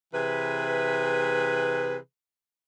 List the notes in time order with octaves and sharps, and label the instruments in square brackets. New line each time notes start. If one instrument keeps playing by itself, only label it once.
[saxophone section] C3 E3 G#4 B4